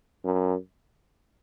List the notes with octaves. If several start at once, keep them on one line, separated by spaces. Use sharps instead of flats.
F#2